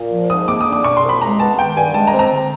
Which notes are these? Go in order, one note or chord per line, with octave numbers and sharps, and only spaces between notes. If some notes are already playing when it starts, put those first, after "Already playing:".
Already playing: A#2
F3
G#2 D#6
A#3 D6
D#6
D4
D6
B2 C#6
C6
C2
B5
G#3 A#5
B3 A5
D#3 G5
G2 G#5
G#3 A5
A#5
C4
A#5
D3